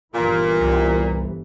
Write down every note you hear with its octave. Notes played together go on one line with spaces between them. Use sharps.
G1 A#2 E3
C2